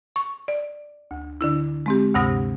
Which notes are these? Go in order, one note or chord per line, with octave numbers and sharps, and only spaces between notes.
C#6
D5
D2
D3 D4 E4
G#3 C4 G4
D2 G2 C3 F#5 D#6 A#6